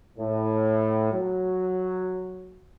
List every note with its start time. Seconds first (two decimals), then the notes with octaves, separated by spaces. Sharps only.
0.19 A2
1.12 F#3